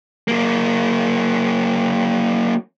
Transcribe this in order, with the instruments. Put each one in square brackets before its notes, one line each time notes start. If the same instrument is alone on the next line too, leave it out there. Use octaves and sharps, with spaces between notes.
[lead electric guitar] F#3 A#3